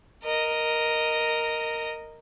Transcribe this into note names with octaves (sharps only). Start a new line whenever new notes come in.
A#4 D#5